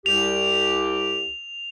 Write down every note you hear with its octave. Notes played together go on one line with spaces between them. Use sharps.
C2 G4 F7